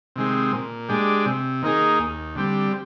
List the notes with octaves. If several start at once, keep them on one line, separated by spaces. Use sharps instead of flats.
C3 D#3 G#3 C4
A#2
G#3 D4 G4
C3
D#3 A#3 D#4 G#4
D#2
D3 G3 C4 G4